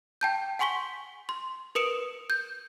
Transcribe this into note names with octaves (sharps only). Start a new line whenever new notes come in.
G5 A5 G6
F#5 G#5 C6 C#6 B6 G7
C6
A#4 B4 D#6 C#7 D7 E7
G6